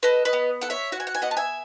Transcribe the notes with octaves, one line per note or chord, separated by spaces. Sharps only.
A4 B4 D#5
B4 D#5
B3
A4 F#5
C#5 E5
F#4 F#5
G#5
F#5
G#5
B3 D#5 F#5
A5
E5 G#5